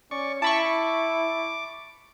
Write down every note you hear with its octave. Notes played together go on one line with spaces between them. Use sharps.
C#4 D5 C#6
E4 A5 B5 C#6 D6